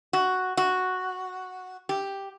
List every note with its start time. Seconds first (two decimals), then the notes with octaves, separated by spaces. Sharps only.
0.13 F#4
0.57 F#4
1.89 G4